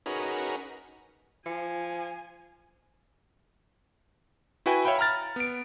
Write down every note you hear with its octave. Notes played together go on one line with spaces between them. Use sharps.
C#4 D#4 F#4 G#4 A#4 B4
F3 G#5
E4 F#4 B4 G5 G#5 B5
C#5 E5 F5 G5 B5
A#5 B5 F6 A6
B3 D7